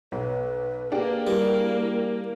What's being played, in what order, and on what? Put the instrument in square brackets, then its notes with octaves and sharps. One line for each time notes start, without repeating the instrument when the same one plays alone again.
[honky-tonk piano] B1 [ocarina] B4
[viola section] A#3 [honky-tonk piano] D4 G4 G#4
[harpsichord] G3 [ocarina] E4